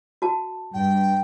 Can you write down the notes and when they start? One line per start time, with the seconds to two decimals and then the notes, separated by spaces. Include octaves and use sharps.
0.22 F#4 A5
0.74 G2 G5